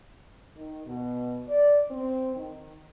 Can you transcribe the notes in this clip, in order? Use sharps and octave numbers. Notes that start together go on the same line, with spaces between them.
D#3
B2
D5
C4
D#3